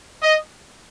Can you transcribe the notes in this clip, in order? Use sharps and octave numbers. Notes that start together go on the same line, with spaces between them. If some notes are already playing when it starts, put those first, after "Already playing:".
D#5